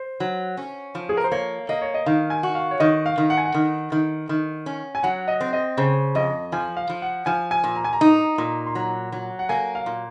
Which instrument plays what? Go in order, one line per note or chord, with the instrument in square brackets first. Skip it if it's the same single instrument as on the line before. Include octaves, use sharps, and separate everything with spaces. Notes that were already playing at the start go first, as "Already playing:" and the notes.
Already playing: [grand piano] C5
[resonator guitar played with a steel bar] F#3
C#4
F3
[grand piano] G#4
A#4
C5
[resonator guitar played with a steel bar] A#3 [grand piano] C#5
[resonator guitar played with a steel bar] A#3 [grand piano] D#5
[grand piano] C#5
D#5
[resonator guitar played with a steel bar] D#3 [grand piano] F5
[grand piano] G#5
[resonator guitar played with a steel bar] F#4
[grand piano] F5
C#5
[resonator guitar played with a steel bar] D#3 [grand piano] D#5
[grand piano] F5
[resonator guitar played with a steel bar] D#3
[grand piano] F#5
G#5
F#5
[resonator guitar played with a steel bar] D#3
D#3
D#3
C#4
[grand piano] G#5
[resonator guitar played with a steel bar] F#3 [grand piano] F#5
[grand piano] D#5
[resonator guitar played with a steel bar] C4
[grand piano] D#5
[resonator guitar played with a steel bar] C#3 [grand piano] C5
[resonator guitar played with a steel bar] F2 [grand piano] D#5
[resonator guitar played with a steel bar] F3 [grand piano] G#5
[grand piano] F5
[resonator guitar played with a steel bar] F3
[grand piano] F#5
[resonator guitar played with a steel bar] F3 [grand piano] G#5
[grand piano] G#5
[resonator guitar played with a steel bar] A#2
[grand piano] A#5
G#5
A#5
[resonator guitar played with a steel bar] D#4
A#2
[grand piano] C6
[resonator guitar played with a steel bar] F#3 [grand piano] A#5
[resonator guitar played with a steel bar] F#3
[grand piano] F#5
[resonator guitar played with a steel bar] A#3 [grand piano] G#5
[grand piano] F5
[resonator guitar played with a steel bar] A#2